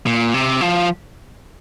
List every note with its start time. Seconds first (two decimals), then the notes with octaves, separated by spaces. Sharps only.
0.06 A#2
0.34 C3
0.61 F3